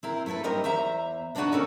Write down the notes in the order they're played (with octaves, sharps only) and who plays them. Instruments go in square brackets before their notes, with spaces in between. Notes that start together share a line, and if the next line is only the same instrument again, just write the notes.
[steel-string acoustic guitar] C4 E4 A#4
A3 E4 G#4 A4 B4
G3 C4 D#4 G4 A#4 D#5
E2 C5 E5 A#5
B3 D4 D#4 F4 F#4 B4
C#4 F#4 G4 A4 A#4